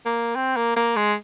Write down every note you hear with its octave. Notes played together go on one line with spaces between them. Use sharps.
A#3
C4
A#3
A#3
G#3